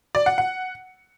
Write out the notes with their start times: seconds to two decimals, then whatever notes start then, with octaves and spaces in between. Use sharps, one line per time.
0.15 D5
0.26 F#5
0.38 F#5